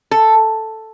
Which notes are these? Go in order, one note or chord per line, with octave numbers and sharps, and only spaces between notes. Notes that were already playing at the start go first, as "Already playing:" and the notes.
A4